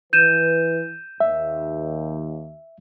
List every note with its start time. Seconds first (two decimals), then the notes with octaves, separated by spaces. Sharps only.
0.13 E3 B4 G6 D#7 E7
1.20 D#2 E5